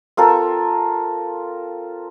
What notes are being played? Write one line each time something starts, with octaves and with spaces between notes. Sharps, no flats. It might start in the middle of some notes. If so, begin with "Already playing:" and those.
C4 F4 A4 A#4